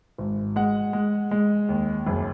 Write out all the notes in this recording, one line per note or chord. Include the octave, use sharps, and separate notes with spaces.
G#1
G#3 F#5
G#3
G#3
D#2
F#1